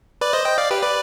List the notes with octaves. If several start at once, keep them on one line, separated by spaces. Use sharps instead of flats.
B4 D5
C5 D#5
D#5 G5
D5 F5
G4 B4
B4 D5